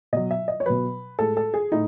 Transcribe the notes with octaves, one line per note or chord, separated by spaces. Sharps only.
B2 F#3 D#5
E5
D#5
C#5
B2 F#3 B4
A2 G#3 A4
A4
G#4
A2 D#4